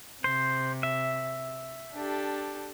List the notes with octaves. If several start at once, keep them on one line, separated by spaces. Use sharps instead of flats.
C3 C5
E5
D4 G4 A4